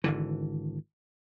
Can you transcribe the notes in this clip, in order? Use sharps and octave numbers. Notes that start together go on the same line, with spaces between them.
G#1 D3 E3